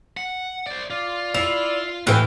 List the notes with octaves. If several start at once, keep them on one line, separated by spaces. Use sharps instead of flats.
F#5
C5 D5
F4 D5
E4 C7 F7
D#2 A2 E3 B4 G5 F6